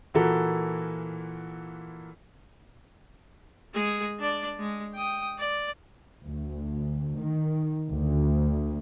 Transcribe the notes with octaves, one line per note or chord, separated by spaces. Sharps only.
A#2 E3 F#4 A4 A#4
G#3 G#4
D4 D5
G#3
G5 D#6
D5
D2
D#3
D2